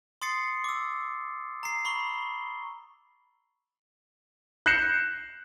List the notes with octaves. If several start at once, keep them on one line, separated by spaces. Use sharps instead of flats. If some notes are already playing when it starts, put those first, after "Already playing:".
C6 D#6 A6 C7 C#7
D6 E6
A#5 C7
B5 C#6 G7
F#6 G6 A#6 C7 C#7 E7